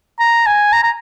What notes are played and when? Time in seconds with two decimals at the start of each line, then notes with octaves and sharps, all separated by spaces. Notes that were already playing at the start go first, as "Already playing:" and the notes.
0.20 A#5
0.47 G#5
0.73 A#5
0.83 A#5